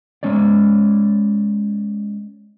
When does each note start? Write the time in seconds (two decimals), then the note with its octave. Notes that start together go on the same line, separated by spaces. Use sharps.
0.23 G#3 C#4 C#5 D5